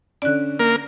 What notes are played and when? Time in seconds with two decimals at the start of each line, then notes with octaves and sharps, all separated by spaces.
0.22 D3 C#4 D5 F#6
0.59 A#3 A#4